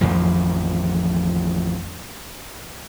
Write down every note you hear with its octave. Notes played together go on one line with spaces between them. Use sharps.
A1 F2 D#3 F3